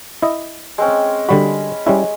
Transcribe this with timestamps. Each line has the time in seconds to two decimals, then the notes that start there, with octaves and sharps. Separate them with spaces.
0.22 E4 D#5
0.78 G#3 C4 C#4
1.29 D3 G3 F#4 B5
1.86 G3 G#3 C#4 E4